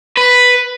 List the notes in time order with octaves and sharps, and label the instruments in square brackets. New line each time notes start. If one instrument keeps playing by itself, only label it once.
[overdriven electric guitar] B4